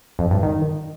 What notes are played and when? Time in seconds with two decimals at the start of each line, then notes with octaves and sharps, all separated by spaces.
0.19 F2
0.31 G2
0.43 D#3